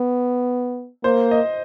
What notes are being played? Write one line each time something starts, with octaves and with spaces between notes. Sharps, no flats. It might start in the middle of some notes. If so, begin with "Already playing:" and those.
Already playing: B3
A#3 C5
D#5